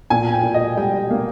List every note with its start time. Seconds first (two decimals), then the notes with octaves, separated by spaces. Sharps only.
0.10 A#2 G#5
0.33 G5
0.43 A#2
0.54 D#5
0.77 G3 G5
1.11 A#3